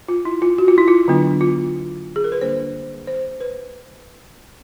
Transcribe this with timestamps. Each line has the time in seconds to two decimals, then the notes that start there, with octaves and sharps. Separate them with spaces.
0.08 F4
0.25 E4
0.42 F4
0.58 F#4
0.68 F4
0.78 E4
0.88 F4
1.08 D3 F#3 B3 D4
1.41 F4
2.16 G#4
2.24 A#4
2.32 B4
2.41 D3 G3 A#3 D4 C5
3.07 C5
3.40 B4